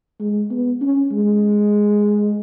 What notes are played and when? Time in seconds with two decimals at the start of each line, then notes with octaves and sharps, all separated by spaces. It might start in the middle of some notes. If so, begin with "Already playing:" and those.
0.20 G#3
0.51 B3
0.81 C#4
1.12 G#3